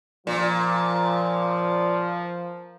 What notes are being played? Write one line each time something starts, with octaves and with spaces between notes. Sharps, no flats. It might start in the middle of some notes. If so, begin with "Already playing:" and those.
A#2 F3